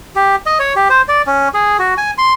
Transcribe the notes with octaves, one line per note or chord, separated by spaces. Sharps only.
G4
D#5
C#5
G4
C5
D5
C#4
G#4
F#4
G#5
C6